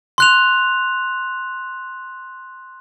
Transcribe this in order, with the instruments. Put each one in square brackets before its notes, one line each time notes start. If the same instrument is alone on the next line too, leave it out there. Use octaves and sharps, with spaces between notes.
[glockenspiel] C6 F#6 F7